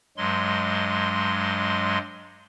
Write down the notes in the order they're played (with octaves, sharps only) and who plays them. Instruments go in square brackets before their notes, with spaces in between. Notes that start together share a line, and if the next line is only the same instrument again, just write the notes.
[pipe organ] G2 F#3 G#3 C6